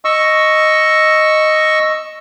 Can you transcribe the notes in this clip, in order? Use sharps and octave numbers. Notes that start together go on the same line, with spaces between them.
D#5 C#6 E6